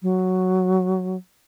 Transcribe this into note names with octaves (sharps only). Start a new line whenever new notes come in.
F#3